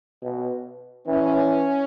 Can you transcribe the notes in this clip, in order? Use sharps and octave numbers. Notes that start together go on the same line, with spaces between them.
B2
E3 C#4